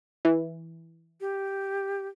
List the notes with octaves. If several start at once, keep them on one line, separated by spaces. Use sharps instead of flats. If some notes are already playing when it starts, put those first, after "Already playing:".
E3
G4